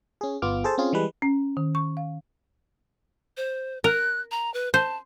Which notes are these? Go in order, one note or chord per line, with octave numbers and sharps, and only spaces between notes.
C#4 G#4
G1 B3 F4 D6 F6
G#4 A4 C5 A5
C4 C#4 F4 G#4
E3 G3 G#3 B4
C#4
D#3
C#6
F5
C5
A#4 F#6
A#5
B4
C5 A5